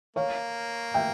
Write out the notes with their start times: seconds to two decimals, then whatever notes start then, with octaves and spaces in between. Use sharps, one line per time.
0.16 A#3 C#5 F5
0.94 E5 G5